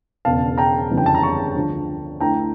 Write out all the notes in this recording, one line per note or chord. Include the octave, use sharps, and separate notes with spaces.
E1 E2 C#3 F5 A5
G5 A#5
G1 F2 C#3 E3 G3
G5
A5
A#5
A5 C#6
D2 D3 F3
D2 D3 A3 E4 G5 A#5